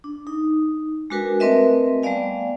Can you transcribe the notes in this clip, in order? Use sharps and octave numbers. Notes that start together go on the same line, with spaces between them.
D4
D#4
G#3 D4 F#4 A#4 B4 G#5
A3 C4 A#4 B4 D#5 E5
G3 A3 B3 D5 F5 G#5